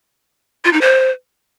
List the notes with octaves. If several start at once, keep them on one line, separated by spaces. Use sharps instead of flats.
F4
D#4
C5